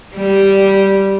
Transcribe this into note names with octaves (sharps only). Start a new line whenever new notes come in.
G3